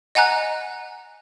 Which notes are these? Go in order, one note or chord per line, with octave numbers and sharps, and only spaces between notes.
D#5 F#5 G#5 A#5 F#6